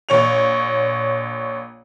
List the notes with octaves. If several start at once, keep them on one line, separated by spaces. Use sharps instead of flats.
A#1 C#5 F7